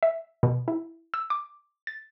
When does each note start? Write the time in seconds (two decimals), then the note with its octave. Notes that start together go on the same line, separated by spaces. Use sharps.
0.03 E5
0.43 B2
0.68 E4
1.14 E6
1.30 D6
1.87 A6